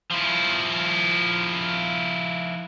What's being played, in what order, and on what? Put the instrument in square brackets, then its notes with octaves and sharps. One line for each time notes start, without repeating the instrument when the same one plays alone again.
[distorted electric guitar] F3 E4